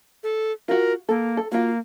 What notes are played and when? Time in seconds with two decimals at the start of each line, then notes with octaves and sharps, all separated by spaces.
0.23 A4
0.68 F4 F#4 A#4
1.09 A#3 A4
1.37 A4
1.52 A#3 F4 F#4